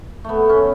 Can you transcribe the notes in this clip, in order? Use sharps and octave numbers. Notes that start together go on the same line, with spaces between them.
A3 B3
C#4